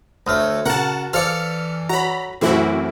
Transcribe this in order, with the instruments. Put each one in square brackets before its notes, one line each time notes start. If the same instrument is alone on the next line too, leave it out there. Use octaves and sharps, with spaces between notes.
[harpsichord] D2 A3 [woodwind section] F#4 C#5 [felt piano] D#6 F6
[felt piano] C#3 [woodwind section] F#4 [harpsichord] A#4 [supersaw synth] F#5 A5
[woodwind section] E3 [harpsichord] A4 D5 [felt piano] C5 F5 [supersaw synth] F6 C#7
[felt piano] F#4 C#5 [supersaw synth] A#5 B5
[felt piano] F#2 E3 A3 [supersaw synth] C4 E4 F#4 [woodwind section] A#4 D6